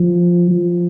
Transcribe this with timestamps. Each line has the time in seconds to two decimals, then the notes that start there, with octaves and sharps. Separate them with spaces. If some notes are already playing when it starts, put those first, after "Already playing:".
Already playing: F3
0.50 F3